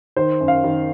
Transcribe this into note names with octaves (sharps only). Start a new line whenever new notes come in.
D#3 C5
F#2
F5
D#3